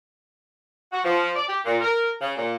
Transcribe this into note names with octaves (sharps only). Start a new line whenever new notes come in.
F#4
F3
D5
G4
A#2
A#4
C#3
A#2